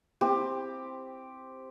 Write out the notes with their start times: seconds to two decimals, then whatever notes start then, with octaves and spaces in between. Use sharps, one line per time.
0.21 C4 G4